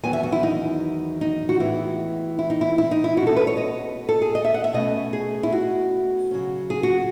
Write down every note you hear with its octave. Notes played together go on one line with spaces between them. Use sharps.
E2 D#3 F#3 B3 G#5
E5
F#4
E4
D#4
D#4
F#4
A2 E3 G#3 B3 E4
E4
D#4
E4
E4
D#4
E4
B2 G#3 C#4 F#4
A4
B4
C#5
D#5
A4
G#4
D#5
E5
F#5
E5
B2 A3 C#4 D#5
G#4
E4
F#4
C#3 F#3 C#4
G#4
F#4